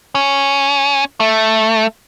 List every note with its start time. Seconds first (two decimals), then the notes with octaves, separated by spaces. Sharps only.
0.15 C#4
1.20 A3